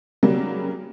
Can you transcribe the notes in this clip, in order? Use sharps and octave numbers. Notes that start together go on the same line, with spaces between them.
C#3 F#3 G3 A#3